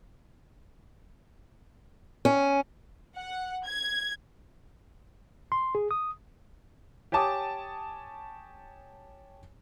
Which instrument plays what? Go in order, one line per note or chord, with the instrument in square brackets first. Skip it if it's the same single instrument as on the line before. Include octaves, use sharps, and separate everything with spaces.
[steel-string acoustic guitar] C#4
[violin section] F#5
G#6
[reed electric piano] C6
G#4
D#6
[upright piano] G4 C#5 G#5 A5 D6 D#6